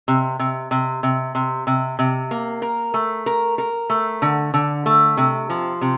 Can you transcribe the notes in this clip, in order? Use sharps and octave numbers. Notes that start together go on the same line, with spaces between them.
C3
C3
C3
C3
C3
C3
C3
A#3
A#4
A3
A#4
A#4
A3
D3
D3
A3
C3
F3
C3